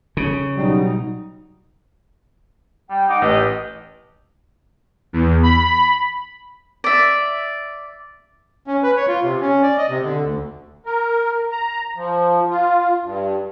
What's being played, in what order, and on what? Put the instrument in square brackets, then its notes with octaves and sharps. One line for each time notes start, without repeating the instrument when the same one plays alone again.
[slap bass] C#3
[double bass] B2 D#4 [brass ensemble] F#3 G3
[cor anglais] G3 [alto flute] G5
[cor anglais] D#4 [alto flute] F#5 [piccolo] D6
[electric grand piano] A1 [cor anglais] G4 [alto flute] B4 [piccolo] D#5
[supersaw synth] E2
B5
[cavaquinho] D5 E5
[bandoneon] C#4
B4
C#5
F4
C3
C#4
D5
D#5
C3
D3
D2
[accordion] A#4
A#5
F3
F4
G2